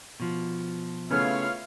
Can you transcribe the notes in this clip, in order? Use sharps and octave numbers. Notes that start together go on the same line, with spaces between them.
B2 F3
C#3 A3 B3 E4 F4 C#5 F5 F6